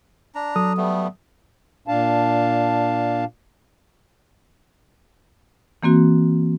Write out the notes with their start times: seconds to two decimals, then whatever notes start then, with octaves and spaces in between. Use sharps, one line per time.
0.35 D4 A#5
0.56 F#3 A4 D#6
0.77 G3 A3 B3
1.88 A#2 D4 F5 A5
5.83 E3 A#3 C4 F#4